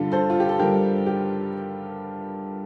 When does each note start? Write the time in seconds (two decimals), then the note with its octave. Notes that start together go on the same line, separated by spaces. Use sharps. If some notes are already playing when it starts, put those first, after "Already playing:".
Already playing: G2 D3 G3 F4 A4
0.12 A4 C5
0.30 F4
0.40 G4
0.49 A4
0.59 G2 D3 G3 G4 A#4
1.06 G4